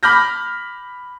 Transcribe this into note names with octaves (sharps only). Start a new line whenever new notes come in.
B5 D6 F6 G6 A#6